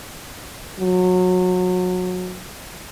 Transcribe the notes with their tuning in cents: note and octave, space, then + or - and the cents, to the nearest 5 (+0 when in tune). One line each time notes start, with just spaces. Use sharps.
F#3 -25